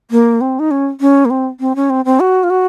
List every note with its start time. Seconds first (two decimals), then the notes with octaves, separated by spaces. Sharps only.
0.11 A#3
0.41 C4
0.59 D#4
0.71 C#4
1.01 C#4
1.25 A#3
1.30 C4
1.60 C4
1.76 C#4
1.90 C4
2.05 C4
2.20 F#4
2.44 F4
2.50 F#4